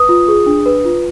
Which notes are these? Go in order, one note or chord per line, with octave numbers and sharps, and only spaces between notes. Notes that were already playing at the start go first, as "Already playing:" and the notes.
Already playing: B4 D#6
F4
G#4
D4
B4
F4